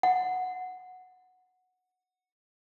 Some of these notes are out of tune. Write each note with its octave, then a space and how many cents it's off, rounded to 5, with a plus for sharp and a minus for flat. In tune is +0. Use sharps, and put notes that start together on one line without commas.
F#5 -10